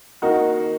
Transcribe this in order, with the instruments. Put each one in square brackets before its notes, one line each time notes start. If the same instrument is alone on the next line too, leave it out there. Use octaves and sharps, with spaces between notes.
[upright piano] D#3 A#3 D#4 F#4